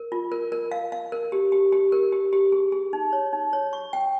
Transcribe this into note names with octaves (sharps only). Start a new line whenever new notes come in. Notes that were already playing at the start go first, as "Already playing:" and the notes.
Already playing: A#4
F4
A#4
A#4
F5
F5
A#4
G4
G4
G4
A#4
G4
G4
G#4
G#4
D#4
C#5
D#4
C#5
C#6
G5